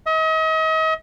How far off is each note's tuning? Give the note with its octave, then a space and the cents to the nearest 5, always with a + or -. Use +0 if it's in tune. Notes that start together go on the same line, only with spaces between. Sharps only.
D#5 +40